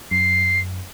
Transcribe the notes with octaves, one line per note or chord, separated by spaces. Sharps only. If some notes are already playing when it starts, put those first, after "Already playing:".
F#2 C7